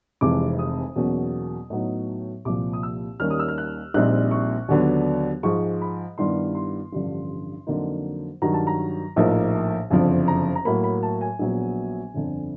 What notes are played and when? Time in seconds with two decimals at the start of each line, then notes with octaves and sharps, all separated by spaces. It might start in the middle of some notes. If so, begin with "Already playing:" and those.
0.21 F1 F2 C3 E3 G#3 D6
0.59 D#6
0.96 E2 B2 F#3 A#3 C#4
1.70 A2 F#3 B3 D#4
2.45 C2 A#2 F3 D6
2.73 D#6
2.83 E6
3.20 D#2 D#3 G3 A#3 C#4 F6
3.30 D#6
3.39 E6
3.48 F6
3.58 F#6
3.94 A#1 A#2 G3 C4 D#4 F#6
4.31 C#6
4.68 D#2 D3 F#3 B3 D4
5.43 G#2 F3 G#3 C#6
5.81 B5
6.18 G2 D#3 G3 B3 E4 C6
6.55 C6
6.92 A1 G2 D3 F3
7.67 F2 D3 F#3 A#3 D#4
8.42 G2 D#3 F#3 A#5
8.54 A5
8.67 A#5
9.16 A#1 A2 F3 A#3 D#4
9.90 F#1 F2 D3 F3
10.28 A#5
10.55 A#5
10.65 A2 F#3 A#3 B5
10.84 B5
11.03 A5
11.21 G#5
11.39 A#1 A#2 F#3 B3
12.14 G1 F2 D3